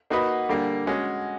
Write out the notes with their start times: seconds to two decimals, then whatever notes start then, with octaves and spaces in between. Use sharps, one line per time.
0.10 A#3 D#4 F#4 B4 D#5
0.49 D3 G3 A#3
0.87 G#3 C#4 F#4